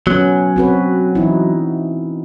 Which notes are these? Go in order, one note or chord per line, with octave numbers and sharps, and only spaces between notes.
F#3 B3 C#4
C4 F#4 B4
E3 D#4 E4